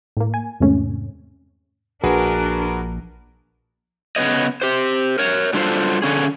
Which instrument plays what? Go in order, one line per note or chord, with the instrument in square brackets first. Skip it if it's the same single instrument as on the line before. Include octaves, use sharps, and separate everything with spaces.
[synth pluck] A2 A#3
G#5
E2 G#2 C3 D#3 A3 C#4
[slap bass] A#1 [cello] D4 A#4 [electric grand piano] F#4 G#4 B4
[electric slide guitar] C#3 B3 C#5 D#5
G4 C5
A#4 C#5
F#3 G3 D4 F4 A4 C5
D3 C#4 G#4